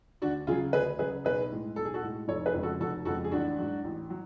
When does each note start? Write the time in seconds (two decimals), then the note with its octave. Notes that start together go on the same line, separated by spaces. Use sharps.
0.22 D2 D4 F#4
0.47 C#3 F4 G#4
0.51 F#3
0.73 D2 G#4 B4
0.99 C#3 F#3 G#4 B4
1.25 B1 G#4 B4
1.52 A2 G#3
1.76 B1 A4
1.85 G#4
1.94 F#4 A4
2.03 A2 G#3
2.28 F1 A4 C#5
2.46 G#4 B4
2.54 F2 C#3 G#3
2.63 F#4 A4
2.80 F1 F#4 A4
3.05 F2 C#3 G#3 F#4 A4
3.24 G#4
3.31 A1 D4 F#4
3.58 G#2 F#3
3.84 A1
4.10 F#3